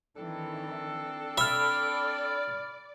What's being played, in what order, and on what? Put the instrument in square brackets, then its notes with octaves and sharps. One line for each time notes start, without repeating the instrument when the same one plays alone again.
[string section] D#3 E3 [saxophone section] C4 D4 A4
[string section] D5 [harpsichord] E5 [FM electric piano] B5 F6